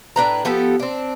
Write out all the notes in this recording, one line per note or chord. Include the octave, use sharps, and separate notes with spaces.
A2 D4 B4 A#5
F3 B3 G4 A4
C4 D4